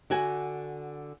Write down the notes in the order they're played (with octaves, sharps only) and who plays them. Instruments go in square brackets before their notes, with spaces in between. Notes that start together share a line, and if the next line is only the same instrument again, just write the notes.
[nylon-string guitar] D3 F#4 G#5